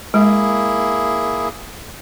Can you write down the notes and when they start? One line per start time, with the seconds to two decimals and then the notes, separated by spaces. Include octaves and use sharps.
0.14 G#3 A#3 E4 G#4